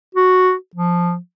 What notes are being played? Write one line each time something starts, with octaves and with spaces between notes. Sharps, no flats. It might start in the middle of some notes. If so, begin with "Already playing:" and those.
F#4
F3